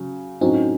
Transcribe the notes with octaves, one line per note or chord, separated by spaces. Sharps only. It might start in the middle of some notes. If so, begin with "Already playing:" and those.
Already playing: C#3 F#3
A2 F#3 C4 C#4 D#4 F#4